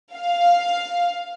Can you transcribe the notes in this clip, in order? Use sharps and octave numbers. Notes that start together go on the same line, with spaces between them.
F5